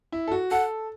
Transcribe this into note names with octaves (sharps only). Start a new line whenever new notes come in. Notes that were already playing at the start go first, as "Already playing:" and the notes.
E4
A4
F#4
A4 F#5